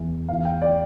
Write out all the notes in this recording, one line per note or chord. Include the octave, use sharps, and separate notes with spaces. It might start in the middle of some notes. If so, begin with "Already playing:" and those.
Already playing: E2 E3
E2 E3 F5
G5
D5